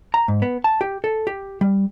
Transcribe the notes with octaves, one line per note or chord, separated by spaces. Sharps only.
A#5
G#2
B3
A5
G4
A4
G4
G3